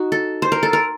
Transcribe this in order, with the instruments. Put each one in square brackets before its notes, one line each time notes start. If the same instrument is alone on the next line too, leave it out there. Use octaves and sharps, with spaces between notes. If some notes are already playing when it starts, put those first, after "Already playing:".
Already playing: [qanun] D#4 F#4
A4
C5
A#4
A4
A#4